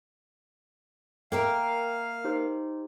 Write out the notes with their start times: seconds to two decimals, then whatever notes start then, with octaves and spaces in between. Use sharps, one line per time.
1.32 A#3 A#4 E5 F5 G5
2.24 D#4 G4 C5